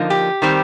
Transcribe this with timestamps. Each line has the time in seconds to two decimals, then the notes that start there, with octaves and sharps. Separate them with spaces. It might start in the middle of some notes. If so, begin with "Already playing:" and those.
Already playing: D3 F3 A#3 D#4
0.10 G4
0.42 D#3 G3 C4